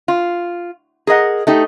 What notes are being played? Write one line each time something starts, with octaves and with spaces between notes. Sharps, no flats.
F4
G#4 A#4 D#5 F#5
A3 D#4 G4 D#5